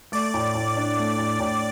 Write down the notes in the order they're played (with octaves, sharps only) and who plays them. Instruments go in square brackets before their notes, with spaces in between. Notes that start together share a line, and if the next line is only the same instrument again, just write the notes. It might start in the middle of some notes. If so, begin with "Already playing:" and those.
[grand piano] A3 [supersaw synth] D5
[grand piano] A2
A2
D4
A3
A2
A2